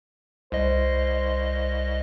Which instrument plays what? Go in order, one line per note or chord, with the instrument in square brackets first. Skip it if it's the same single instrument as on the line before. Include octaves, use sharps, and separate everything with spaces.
[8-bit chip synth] C2 D#5 [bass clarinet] C5